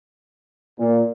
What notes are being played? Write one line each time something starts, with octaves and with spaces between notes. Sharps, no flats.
A#2